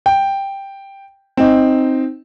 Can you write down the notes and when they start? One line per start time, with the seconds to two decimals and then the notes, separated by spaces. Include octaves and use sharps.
0.06 G5
1.37 C4 D#4